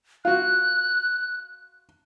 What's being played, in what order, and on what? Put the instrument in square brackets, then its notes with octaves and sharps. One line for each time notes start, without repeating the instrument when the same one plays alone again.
[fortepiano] F4 F#4 [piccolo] F#6